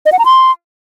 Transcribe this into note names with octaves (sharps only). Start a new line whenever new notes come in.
D#5
F#5
A#5
C6